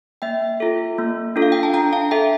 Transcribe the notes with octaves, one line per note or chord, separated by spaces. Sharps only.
A#3 E5 G5
F4 A4
A#3
D4 F4 A4
F5
G5
A5
D4 G5 A#5
F5 A5
A4 E5 G5